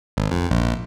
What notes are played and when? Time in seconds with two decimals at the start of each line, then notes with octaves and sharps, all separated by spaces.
0.17 G#1
0.31 F2
0.51 A#1